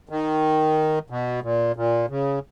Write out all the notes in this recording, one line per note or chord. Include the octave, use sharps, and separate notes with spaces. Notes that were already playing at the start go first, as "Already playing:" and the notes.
D#3
B2
A#2
A#2
C#3